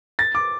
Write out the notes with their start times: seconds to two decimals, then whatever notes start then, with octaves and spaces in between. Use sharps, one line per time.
0.19 A6
0.35 D6